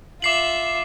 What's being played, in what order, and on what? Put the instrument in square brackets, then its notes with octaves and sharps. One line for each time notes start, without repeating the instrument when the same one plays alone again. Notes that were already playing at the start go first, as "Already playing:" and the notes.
[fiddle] F4 E5 [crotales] D6 C7 F#7